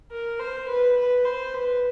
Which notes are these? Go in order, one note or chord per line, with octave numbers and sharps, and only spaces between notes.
A#4
C5
B4
B4
C5
B4